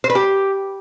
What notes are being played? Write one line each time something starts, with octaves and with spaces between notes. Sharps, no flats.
C5
B4
G4